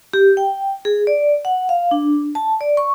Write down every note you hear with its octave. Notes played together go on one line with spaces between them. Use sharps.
G4
G5
G#4
D5
F#5
F5
D4
A5
D5
C#6